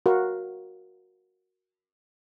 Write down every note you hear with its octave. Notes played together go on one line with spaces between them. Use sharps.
F#4 A#4 F5